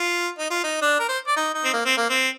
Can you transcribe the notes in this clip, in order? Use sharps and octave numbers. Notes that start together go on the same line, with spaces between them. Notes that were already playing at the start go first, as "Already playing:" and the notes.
Already playing: F4
D#4
F4
D#4
D4
A#4
C5
D5
D#4
D#4
C4
A#3
C4
A#3
C4